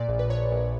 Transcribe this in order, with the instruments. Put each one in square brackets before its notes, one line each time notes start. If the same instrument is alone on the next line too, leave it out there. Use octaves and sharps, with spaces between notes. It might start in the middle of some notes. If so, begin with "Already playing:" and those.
Already playing: [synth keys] A#2 D5
A#1
B4
A#1 C#5
A#1